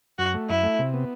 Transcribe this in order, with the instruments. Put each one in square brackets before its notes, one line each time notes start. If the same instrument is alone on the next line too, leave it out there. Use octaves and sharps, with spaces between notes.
[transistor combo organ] F#2 [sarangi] F#4
[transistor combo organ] A3
[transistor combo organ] F#2 [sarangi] E4
[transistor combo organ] A3
C3
B3